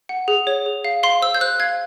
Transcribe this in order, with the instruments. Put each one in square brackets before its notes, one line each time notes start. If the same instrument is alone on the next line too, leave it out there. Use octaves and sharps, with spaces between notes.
[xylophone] F#5
G#4
C#5
G#4
F5
F5 C6
C5 E6
G6
C5 F#6
F5 G#6